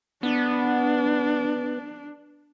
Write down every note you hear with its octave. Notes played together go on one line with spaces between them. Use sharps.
B3 D4